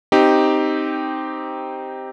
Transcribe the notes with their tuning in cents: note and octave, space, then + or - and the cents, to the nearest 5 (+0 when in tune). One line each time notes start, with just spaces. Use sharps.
C4 +0 D#4 +0 G4 +0